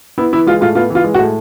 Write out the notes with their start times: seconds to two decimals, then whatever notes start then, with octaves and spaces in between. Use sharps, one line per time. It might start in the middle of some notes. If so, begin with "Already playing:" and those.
0.18 B3 E4
0.32 E3 E4
0.47 G#3 F4
0.61 A2 F4
0.75 B3 F4
0.90 E3
0.95 F4
1.04 G#3
1.14 F#4
1.19 A2